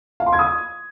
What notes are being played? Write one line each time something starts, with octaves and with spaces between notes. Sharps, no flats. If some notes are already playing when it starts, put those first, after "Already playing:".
F5
C6
G#6
D#6